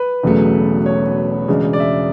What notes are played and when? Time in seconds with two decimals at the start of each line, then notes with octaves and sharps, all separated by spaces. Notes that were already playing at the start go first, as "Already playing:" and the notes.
Already playing: B4
0.23 E1 E2 C#3 F#3 A3
0.86 C#5
1.48 E1 E2 C#3 G#3 D4
1.73 D5
1.80 E5